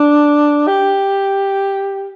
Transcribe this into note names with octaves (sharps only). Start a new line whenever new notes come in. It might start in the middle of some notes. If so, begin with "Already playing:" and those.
Already playing: D4
G4